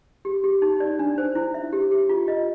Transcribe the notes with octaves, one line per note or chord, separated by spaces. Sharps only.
G4
G4
D#4
D5
D4
C5
E4
E5
G4
G4
F4
D#5